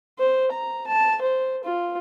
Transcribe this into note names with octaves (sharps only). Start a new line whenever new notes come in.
C5
A#5
A5
C5
F4